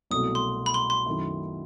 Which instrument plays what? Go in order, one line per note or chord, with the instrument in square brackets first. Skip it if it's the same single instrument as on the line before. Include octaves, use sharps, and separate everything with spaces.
[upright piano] C2 B2 F#3 A3 [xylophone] D#6
[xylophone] C6
B5
C6
C6
[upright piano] F#2 D#3 A3 E4